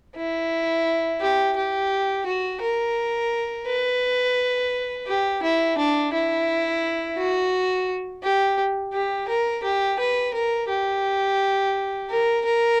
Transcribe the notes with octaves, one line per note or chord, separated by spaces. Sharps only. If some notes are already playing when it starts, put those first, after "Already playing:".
E4
G4
G4
F#4
A#4
B4
G4
E4
D4
E4
F#4
G4
G4
A#4
G4
B4
A#4
G4
A#4
A#4